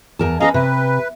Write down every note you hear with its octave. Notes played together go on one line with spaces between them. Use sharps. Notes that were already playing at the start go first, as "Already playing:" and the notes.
E2 A#4 A5
C#4 A#4 B4 D#5 F5 A#5
C3 B4